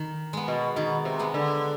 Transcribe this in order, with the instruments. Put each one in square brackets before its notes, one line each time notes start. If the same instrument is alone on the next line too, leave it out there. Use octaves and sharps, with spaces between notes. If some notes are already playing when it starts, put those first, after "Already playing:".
Already playing: [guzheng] D#3
G#3 B3
[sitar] B2
[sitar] B2 [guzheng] D#3
[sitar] C3
[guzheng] G#3 B3
[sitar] D3